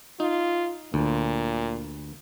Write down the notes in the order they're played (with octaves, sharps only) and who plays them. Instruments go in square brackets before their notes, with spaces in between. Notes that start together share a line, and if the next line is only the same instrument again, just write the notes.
[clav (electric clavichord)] D#4 [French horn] F4
[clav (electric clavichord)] D2 [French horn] A#2